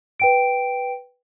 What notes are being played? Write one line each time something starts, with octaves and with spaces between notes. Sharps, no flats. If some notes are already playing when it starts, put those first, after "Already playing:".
B4 G5 D7